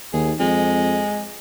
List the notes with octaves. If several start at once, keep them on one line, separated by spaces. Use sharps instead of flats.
D#2 G#4
F2 G#3